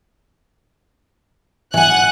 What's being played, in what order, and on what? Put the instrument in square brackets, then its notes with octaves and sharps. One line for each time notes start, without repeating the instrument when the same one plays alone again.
[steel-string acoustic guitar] E3 G#5 [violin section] F#5 F#6